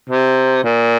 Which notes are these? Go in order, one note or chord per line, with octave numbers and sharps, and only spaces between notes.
C3
A#2